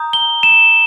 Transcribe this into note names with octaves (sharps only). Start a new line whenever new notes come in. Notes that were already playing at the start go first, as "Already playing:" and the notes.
Already playing: A#5 D#6 G6
G7
E7